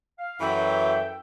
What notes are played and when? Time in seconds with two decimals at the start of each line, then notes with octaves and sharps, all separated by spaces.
0.19 F5
0.40 F#2 E3 F#3 A4 E5 G5